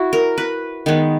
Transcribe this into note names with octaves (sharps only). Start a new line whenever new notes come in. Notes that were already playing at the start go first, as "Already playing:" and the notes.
Already playing: E4 F#4
A#4
B4
D#3 G#3 B3